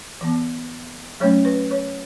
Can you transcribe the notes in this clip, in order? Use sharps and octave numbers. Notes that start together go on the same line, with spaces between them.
E3 B3
F#3 A3 C#4 C#5
B4
C#5